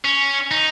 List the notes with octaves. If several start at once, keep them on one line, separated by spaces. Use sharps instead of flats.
C#4
D#4